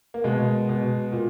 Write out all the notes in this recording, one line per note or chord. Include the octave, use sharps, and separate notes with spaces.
A#3
B2 G#3
B2
A#2